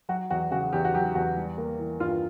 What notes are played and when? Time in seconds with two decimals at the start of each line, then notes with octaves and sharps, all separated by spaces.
0.09 F#3 F#4
0.30 E2 F#4
0.51 C#3 F#4
0.73 E2 G4
0.85 F#4
0.94 F#3 G4
1.15 E2 F#4
1.36 G3
1.58 A#3
1.79 E3
2.00 G2 F4